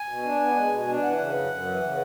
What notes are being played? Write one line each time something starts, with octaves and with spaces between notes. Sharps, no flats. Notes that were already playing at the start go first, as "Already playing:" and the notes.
Already playing: G#5
B2
D4
B3
G#3
B2
D4
E3 F#5
C#3
F#2
F#2
E3
C#3